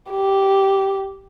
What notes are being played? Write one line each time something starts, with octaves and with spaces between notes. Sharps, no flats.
G4